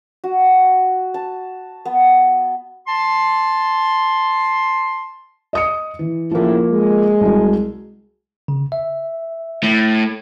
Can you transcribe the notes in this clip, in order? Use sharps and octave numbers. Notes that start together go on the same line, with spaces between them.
F#4
A5
B3
A5 C6
D#5 D#6 C#7
E3
A2 C#3 F3 A#3 E4
G#3
C2 F#3
C#3
E5
A2